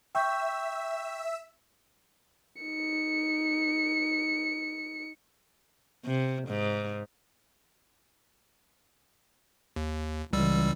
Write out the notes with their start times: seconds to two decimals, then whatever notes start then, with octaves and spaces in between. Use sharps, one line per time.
0.15 E5 G5 C#6 E6 G6
2.62 D#4 C#7
6.05 C3
6.49 G#2
9.76 D#2
10.33 C#2 C#3 E3 G3 E6